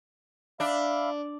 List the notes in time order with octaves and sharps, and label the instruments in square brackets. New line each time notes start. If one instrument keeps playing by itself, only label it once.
[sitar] D4 [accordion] E5 F5 B5